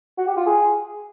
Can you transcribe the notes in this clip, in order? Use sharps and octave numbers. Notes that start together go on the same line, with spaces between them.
F#4
G4
F4
G#4